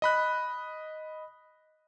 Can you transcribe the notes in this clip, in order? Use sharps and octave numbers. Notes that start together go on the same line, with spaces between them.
D#5 B5 F#6